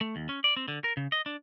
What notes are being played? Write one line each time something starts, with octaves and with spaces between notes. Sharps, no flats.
A3
D#2
C#4
D5
C4
D3
A#4
C#3
D#5
D4